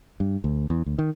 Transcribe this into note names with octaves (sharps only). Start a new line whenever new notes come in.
G2
D2
E2
D2
D#3